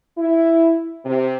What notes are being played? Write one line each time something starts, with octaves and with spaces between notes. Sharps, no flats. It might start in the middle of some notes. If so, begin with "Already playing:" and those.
E4
C3